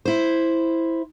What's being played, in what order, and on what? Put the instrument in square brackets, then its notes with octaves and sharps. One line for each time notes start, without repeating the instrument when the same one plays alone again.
[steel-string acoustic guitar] E4 C5